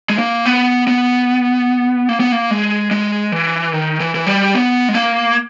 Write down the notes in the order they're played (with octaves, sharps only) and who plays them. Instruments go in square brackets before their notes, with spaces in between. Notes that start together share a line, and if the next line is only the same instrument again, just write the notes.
[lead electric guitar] G#3
A#3
B3
B3
A#3
B3
A#3
G#3
G#3
E3
D#3
E3
E3
G3
B3
G#3
A#3